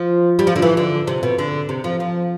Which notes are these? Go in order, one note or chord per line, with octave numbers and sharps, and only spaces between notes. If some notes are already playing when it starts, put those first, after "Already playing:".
Already playing: F3
G3
F3
D3
E3
D3
C3
B2
D3
C3
F3
F3